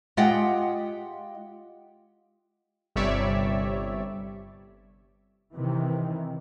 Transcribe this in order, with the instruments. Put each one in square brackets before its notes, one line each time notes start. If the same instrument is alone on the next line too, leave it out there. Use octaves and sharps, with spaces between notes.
[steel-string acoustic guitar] G#3 F4 G4 D#5 F#5 G5
[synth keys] G1 C3 G3 C#5 D5 E5
[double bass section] C3 D#3 E3